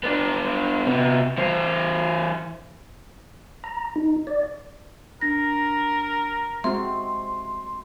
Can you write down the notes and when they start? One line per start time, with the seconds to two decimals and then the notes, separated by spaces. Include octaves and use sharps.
0.04 B3 D4
0.87 C3 B3
1.38 E3 C5
3.64 A#5
3.96 D#4
4.27 D5
5.21 D4 A#4 A#6
6.64 G#3 C4 F#4 E5 C6